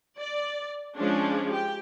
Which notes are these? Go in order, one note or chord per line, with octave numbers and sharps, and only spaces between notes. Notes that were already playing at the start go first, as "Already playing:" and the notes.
D5
F3 G#3 C#4 D4
G4 G5